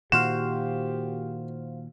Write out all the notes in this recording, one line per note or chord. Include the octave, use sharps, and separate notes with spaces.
A#2 D#3 F#4 G4 C5 F5 E7